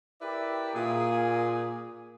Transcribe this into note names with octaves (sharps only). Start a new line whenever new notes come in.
E4 G4 A#4 B4 D5 E5
A#2 G#4